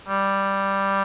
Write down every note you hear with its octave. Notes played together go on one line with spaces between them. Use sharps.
G3